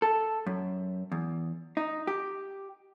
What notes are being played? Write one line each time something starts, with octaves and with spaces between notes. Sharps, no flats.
A4
F#2
E2
D#4
G4